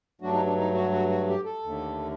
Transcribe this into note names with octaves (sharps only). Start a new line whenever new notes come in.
G2 F#3 A3 D4 F#4
D#4
D4
D#4
F#4
F#4
F#4
G4
A4
D#2 D3 A3